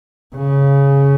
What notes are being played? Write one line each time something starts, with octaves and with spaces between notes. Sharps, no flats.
C#3